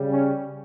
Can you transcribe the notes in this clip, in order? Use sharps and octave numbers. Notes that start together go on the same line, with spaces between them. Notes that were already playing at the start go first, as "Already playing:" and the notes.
Already playing: C#3 G3
C#4